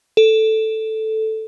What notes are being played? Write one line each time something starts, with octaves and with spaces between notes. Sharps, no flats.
A4